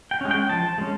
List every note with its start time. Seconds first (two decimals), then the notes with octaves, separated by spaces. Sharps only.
0.11 G5
0.21 G#3 C#4
0.31 G5
0.50 F3 A5
0.78 G#3 C#4